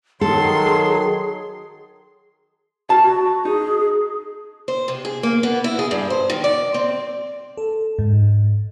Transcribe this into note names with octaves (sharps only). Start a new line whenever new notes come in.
D#3 F#3 G#4 A4 C6
F#4 A5
F#4
D#4 G#4
C5
C3
G#4
A#3
B3
E4
G#4
G2
C5
D#3
D5
C4
A4
G#2